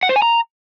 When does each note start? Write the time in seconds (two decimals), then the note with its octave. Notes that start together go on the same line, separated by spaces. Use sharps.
0.03 F#5
0.09 C5
0.16 G#5
0.22 A#5